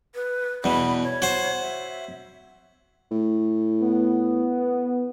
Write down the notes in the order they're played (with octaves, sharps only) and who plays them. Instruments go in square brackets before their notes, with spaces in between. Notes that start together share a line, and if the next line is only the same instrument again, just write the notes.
[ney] B4
[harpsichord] E2 B2 [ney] B5
[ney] C#5
[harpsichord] F#4 C5
[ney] E5
[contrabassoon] A2
[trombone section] B3